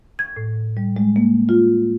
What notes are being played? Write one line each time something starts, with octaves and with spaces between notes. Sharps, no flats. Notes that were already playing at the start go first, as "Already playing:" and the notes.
G#6
A2
G3
G#3
A#3
F4